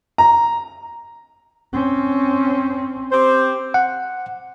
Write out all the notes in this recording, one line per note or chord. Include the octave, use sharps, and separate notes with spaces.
A#5
C4 C#4
C4 G4 C5
F#5